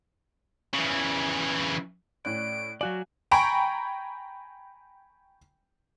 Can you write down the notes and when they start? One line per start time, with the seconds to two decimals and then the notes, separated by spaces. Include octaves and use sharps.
0.74 C#3 E3
2.25 A2 C#4 D5 F#6 D7
2.81 F#3 F#4 D5 F5 G#5
3.31 G5 G#5 A#5 B5 C#6 D7